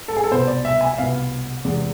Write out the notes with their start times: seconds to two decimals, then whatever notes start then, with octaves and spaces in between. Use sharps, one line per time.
0.08 A4
0.17 G#4
0.24 A4
0.31 C2 B2 B3 C5
0.47 D5
0.65 E5
0.81 G#5
0.93 E5
0.98 C2 B2 B3 F5
1.65 E2 C3 G#3